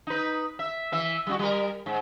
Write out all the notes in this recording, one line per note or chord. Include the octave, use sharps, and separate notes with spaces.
D#4 B4
E5
E3 E5
G3 D#4 F#4
G3 A#4
G#2